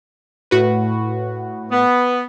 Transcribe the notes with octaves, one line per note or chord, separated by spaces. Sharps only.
A2 F#4 B4
B3